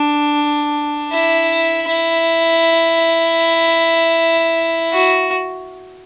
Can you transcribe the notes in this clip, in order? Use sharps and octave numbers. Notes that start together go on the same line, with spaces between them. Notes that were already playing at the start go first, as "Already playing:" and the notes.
Already playing: D4
E4
E4
F#4